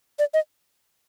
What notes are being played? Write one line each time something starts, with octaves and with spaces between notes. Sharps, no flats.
D5
D#5